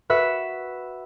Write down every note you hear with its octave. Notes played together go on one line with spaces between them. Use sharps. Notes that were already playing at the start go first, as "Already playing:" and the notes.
F#4 B4 E5